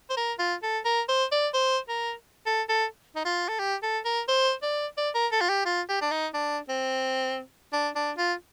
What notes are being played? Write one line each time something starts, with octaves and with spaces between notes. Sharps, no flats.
C5
A#4
F4
A4
A#4
C5
D5
C5
A#4
A4
A4
D#4
F4
A4
G4
A4
A#4
C5
D5
D5
A#4
A4
F4
G4
F4
G4
D4
D#4
D4
C4
D4
D4
F4